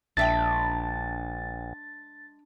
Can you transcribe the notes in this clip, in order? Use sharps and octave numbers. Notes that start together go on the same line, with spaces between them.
A#1 G#3 D4 E5 G5 A6